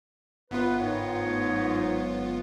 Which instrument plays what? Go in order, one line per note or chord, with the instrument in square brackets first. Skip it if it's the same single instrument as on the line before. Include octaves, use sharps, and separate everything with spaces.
[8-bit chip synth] G1 B3 F4 [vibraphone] A#4 E5 F#5 [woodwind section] B4
[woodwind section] G#2 C#5 [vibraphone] G5
[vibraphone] A3
F#3 G#3